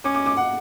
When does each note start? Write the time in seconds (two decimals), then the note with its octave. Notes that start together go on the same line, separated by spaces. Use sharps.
0.04 C#4 D6
0.15 D6
0.26 D6
0.37 F#5